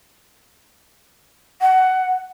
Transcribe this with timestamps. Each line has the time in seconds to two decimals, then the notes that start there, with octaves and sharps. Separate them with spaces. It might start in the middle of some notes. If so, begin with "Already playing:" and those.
1.61 F#5